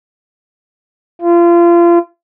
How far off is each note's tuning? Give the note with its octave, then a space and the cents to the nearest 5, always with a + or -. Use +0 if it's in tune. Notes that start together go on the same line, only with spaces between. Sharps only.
F4 -30